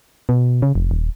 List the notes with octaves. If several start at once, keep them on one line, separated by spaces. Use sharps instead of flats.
B2
C#3
F1
D#1